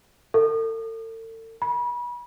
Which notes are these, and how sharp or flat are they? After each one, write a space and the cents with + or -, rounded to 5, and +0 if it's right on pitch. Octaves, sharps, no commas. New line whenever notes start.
A4 +40
B5 -35